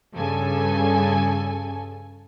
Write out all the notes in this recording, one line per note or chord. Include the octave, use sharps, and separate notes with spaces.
G2 C#3 A4 G#5